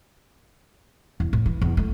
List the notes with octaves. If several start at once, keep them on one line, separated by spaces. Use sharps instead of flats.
E2
A2
E3
E2
A3